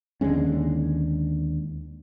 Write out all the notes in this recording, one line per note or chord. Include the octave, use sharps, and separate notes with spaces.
D#2 D3 G#3 C#4